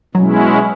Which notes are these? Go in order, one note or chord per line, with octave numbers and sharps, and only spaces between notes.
B2 F#3 G#3 C#4 E4